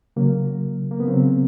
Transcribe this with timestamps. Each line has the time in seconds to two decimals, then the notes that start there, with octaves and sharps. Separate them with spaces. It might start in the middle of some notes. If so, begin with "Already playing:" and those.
0.16 C#3 F#3 A#3
0.91 A#3
1.00 B3
1.08 C#3 F#3 C4